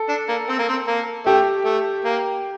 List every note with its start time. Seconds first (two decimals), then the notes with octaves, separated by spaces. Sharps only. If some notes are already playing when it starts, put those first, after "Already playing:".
Already playing: A4
0.09 D4
0.29 A#3
0.49 C4
0.59 A#3
0.69 C4
0.88 A#3
1.26 A3 G4 G5
1.65 A3
2.04 A#3